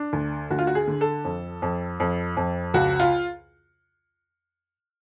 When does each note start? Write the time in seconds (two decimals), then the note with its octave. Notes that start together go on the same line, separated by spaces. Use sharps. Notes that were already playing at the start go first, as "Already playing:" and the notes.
Already playing: D4
0.13 D2
0.51 D2 F#4
0.59 F4
0.67 F#4
0.75 G#4
0.88 D3
1.01 A4
1.25 F2
1.62 F2
2.00 F2
2.37 F2
2.74 C#2 F#4
3.00 F4